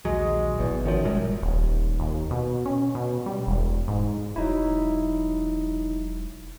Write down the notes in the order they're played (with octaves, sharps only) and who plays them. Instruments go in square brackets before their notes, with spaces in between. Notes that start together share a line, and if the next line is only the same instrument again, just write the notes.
[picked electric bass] A#1 D#2 F#3 [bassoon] G#3
[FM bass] G#1 [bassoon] E2 [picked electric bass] B2
[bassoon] F#2 [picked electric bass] D#3 F3
[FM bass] G1 [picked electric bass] A#2 G3 G#3
[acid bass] D#1
D#2
B2
C#4
B2
G3
E1
G#2
[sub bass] E1 [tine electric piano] F#3 D#4 E4